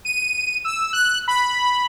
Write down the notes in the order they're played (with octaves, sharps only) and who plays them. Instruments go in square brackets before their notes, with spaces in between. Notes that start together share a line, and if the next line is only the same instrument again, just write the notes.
[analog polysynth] D#7
E6
F#6
B5